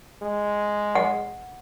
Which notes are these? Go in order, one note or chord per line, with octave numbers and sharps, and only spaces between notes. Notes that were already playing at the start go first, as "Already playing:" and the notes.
G#3
F#5